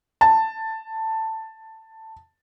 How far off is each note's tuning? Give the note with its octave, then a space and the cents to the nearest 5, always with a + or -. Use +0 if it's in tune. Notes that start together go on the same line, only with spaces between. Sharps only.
A5 +10